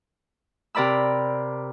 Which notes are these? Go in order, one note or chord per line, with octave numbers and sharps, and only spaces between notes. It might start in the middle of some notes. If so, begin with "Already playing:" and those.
C3 A#4 D5 B5 E6